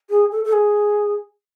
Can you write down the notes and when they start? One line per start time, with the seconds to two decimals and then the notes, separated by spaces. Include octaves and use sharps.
0.10 G#4
0.32 A4
0.45 A4
0.53 G#4